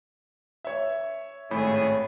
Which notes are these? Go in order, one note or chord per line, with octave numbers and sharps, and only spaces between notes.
C#5 E5
G#1 A2 A3 C#4 G#4 B5